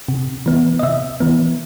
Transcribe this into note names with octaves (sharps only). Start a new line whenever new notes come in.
C3
E3 B3
D#5
C3 E5
E3 B3